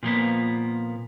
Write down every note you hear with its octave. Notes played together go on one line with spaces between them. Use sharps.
A#2 F3 A#3 B3